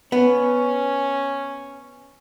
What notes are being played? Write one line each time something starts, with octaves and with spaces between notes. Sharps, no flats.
B3 C#4